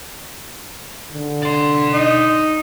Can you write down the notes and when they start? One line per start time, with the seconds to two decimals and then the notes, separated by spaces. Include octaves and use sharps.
1.13 D3
1.43 D5 C6
1.93 D#4